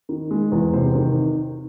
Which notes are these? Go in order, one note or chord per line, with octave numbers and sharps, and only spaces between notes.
D#3
G#3
E2
C3 C5
D#3